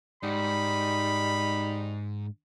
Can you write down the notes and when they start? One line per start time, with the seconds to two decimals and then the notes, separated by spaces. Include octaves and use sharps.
0.23 G#2 G3 D#4 B5